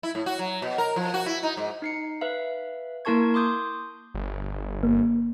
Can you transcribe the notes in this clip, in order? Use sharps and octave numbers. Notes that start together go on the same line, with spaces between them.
E4
A2
F#4
F#3
B2
A#4
F3
F#4
E4
D#4
G#2
D#4 C7 C#7
B4 E5 F5
A#3 E4 A#4 A5 C#6 G#6
C6 D6 D#6 G6
G1
A#3